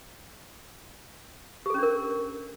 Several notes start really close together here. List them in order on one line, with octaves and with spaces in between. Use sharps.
G4 A4 C#4 D4 A#4